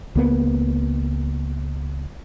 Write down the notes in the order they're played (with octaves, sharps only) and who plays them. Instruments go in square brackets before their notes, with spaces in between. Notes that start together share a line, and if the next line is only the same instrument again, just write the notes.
[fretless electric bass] C#2 A#3 B3